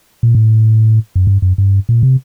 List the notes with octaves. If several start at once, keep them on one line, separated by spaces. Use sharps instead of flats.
A#2
A2
F#2
G2
F#2
G2
A#2
C3